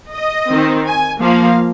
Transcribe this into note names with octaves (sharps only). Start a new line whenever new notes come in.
D#5
D#3 C4
G#5
F3 A#3 F5